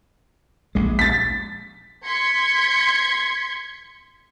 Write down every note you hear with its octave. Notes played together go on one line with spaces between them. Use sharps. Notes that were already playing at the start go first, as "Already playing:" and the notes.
A#1 G#3
A6 B6
C6 G#6 B6 C#7